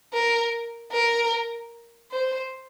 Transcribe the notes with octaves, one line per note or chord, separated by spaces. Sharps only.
A#4
A#4
C5